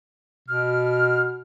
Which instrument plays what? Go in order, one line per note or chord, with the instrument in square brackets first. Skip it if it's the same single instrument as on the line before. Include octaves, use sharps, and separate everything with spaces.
[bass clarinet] B2 [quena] F6